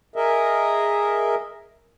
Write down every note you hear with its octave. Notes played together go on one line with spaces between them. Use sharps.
G#4 A#4 D#5 E5